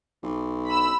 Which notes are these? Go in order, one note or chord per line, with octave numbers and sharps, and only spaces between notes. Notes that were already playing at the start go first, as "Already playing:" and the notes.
B1
B5 E6